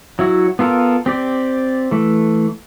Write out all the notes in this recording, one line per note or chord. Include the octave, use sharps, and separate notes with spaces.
F#3 E4 F#4
B3 F4 A4 A#4
C4 G4 D5
E3 A3